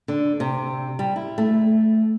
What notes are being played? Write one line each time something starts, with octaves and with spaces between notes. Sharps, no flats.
D3
C3
G3
E4
A3